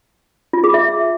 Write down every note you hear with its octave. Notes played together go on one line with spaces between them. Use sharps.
F4
G#4
E5